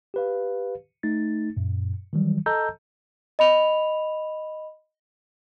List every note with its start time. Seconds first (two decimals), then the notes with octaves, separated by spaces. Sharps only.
0.14 G4 B4 F5
1.03 A3 D#4 A6
1.57 F#2 A#2
2.13 D#3 E3 F#3 G3
2.46 A4 D#5 A5 A#5 E6 G6
3.39 D#5 B5 F7